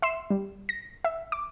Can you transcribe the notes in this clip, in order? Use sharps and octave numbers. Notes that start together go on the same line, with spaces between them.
E5 C6 C7 E7
G3
A#6
E5
D6